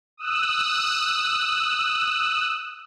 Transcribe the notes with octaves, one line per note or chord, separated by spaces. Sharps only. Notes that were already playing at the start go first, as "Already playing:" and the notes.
D#6 E6 F#6